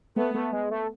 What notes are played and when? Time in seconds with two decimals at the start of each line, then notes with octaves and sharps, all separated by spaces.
0.16 A3 B3
0.34 A3
0.53 G#3
0.71 A3